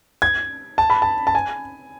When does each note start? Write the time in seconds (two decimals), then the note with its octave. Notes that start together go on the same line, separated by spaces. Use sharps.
0.22 G#6
0.78 A5
0.90 B5
1.02 A5
1.27 A5
1.35 G#5